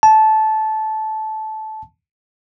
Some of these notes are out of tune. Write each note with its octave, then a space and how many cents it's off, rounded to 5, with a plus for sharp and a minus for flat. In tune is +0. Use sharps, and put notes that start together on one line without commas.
A5 -15